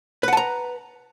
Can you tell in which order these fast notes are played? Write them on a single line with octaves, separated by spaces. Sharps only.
B4 F#5 A5 A#5